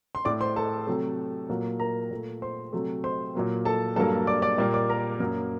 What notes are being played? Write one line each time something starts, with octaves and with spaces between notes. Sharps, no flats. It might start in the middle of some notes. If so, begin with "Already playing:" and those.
C6
A2 A3 D5 D6
C5 C6
A4 A5
C3 F#3 A3
A#2 F#3 A#3
A#4 A#5
A#2 A3
C5 C6
C3 F#3 A3
C5 C6
A#2 F#3 A#3
A4 A5
G2 F#3 A#3 A4 A5
D5 D6
D5 D6
A#2 G3 A#3 D5 D6
D5 D6
A#4 A#5
F#2 F#3 A#3